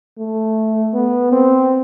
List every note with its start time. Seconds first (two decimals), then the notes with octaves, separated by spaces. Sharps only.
0.18 A3
0.94 B3
1.32 C4